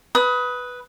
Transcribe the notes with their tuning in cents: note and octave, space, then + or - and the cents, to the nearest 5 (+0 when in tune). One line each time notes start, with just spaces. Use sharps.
B4 +0 D#6 +25